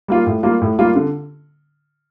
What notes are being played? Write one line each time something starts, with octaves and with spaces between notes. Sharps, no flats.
G3 A#3 F4
A2
G3 A#3 F4
A2
G3 A#3 F4
D3